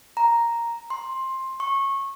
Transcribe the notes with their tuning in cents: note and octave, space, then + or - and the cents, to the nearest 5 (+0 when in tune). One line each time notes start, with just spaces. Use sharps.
A#5 +0
C6 +15
C#6 -20